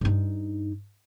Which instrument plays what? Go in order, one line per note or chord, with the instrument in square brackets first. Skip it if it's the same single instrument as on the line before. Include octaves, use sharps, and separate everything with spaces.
[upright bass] G2 D#4